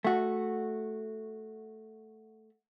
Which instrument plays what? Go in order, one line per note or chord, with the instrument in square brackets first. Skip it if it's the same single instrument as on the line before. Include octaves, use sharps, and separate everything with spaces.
[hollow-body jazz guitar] A3 F#4